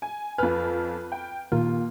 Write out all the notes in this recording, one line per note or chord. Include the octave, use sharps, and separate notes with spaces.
G#5
F2 B4 G#5 F6
G5
D#2 A#2 D#3 A#3 F4